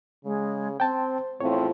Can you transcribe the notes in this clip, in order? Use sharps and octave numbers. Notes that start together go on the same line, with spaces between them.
C#3 G#3
C4 C5 G5 A5
E2 A2 F3 C4 C#5